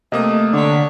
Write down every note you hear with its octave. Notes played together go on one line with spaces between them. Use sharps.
C3 A3 A#3 D#5 D#6
D3 D4 C#5 D5 B6